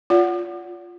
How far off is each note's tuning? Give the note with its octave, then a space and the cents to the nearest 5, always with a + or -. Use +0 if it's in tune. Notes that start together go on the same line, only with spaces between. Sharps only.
F4 +0 D5 -40 F#5 +0